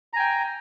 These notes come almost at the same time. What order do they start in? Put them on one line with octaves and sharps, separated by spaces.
A#5 G#5 G5